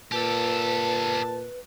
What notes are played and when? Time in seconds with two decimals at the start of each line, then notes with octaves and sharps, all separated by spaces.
0.12 A#2 G4 A4 B4 A5